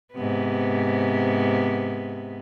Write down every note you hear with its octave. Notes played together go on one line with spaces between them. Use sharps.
G#2 C3 B3